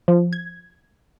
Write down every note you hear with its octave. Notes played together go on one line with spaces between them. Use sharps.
F3
G#6